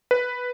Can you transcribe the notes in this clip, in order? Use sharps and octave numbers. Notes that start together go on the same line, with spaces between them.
B4